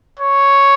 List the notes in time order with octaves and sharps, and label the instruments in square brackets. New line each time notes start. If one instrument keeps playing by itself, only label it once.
[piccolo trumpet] C#5